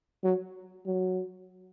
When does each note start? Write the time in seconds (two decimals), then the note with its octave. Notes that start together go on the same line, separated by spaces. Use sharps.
0.24 F#3
0.86 F#3